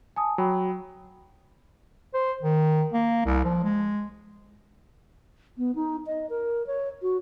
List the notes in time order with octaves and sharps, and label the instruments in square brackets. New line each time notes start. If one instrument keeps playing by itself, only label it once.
[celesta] G#5 A5 D#6
[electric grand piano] F#3 [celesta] G5 B5
[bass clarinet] C5
D#3
A#3
C2
F3
G#3
[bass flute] B3
D#4
D#5
A#4
C#5
F#4